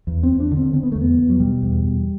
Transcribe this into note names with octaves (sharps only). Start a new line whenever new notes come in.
E2
C4
E2
D4
D3
C4
D3 C4
B3
E2 A3
B3
E2
F#3
B2 G3
E2
E2